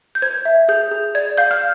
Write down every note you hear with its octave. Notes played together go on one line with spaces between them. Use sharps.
G6
C5 G#6
E5
G#4 G6
G#4
D5 G#6
F5 G6
F6